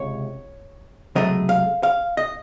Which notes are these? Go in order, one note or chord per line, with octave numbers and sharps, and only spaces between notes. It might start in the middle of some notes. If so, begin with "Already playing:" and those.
Already playing: C#2 C3 C#5
C#2 C3 F#3 A3 D#5
F5
F5
D#5